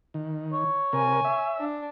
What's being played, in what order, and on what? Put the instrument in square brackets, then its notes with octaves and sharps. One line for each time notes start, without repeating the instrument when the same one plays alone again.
[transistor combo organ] D#3
[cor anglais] C#5
[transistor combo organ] C3 A#4 [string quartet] G#5
[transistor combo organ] E5
[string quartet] D4